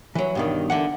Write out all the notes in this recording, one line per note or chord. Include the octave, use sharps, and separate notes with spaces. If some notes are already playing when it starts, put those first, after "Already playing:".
E3 F#3
G2 B2 D#3
D3 E3 F#5